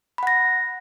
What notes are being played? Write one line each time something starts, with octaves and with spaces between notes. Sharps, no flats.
F#5 B5 A#6